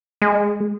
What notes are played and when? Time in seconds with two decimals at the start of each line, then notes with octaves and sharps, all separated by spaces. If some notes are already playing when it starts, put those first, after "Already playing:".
0.22 G#3